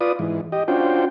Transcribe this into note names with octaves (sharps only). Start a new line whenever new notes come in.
F4 B4 D5 D#6
G#2 E3
G4 D#5
C#4 D4 F4 F#4 C5 G5